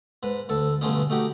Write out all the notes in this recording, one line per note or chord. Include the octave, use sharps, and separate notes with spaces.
G#2 B4
D2 A4
B1 G2 D3 A3 C#4 D#4
A3 D#4 F#4 G4